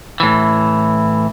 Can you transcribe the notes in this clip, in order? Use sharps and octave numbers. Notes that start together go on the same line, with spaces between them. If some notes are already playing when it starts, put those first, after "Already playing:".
A2 E3